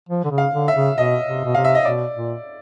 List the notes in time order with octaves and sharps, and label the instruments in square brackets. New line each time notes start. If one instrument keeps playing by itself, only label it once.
[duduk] F3
D3
C#3
[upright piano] F5
[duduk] D3
[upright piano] E5
[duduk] C#3
[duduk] B2 [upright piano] D#5
[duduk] C3
B2
[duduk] C3 [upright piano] F5
[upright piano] E5
D#5
[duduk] B2 [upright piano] D5
[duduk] A#2